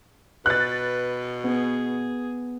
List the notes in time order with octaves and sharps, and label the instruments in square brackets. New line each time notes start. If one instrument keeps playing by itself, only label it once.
[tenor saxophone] B2 [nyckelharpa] B4 [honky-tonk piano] F#6 A6
[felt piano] B3 [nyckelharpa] G#4